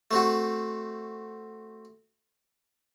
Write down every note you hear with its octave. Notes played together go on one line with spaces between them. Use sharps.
A3 C4 F#4